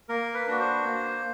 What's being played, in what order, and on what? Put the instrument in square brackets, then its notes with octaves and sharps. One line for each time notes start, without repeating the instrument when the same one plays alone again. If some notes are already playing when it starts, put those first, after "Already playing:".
[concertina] A#3 A#4
B4
D4 F#4
C5
A#3